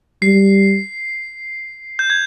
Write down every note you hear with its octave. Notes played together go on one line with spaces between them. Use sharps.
G3 C7
G6
G#6